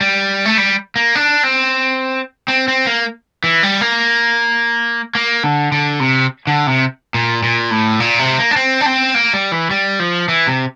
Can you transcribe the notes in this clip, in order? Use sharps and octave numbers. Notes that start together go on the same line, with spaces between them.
G3
A3
G3
A#3
D4
C4
C4
C4
A#3
E3
G3
A#3
A#3
D3
D3
C3
D3
C3
A#2
A#2
A2
A#2
C3
A#3
D4
C4
D4
C4
A#3
G3
E3
G3
F3
E3
C3